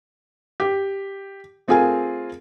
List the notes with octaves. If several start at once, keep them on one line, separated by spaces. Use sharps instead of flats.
G4
A3 C4 F4 G#4 A#4 G#5